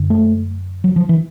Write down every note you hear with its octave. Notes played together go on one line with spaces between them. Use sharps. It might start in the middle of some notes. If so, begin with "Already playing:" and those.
Already playing: F#2 D3
A3
F#3
F3
E3